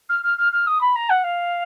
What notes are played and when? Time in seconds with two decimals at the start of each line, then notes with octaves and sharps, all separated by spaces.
0.09 F6
0.23 F6
0.38 F6
0.53 F6
0.67 D#6
0.81 B5
0.96 A#5
1.10 F#5
1.24 F5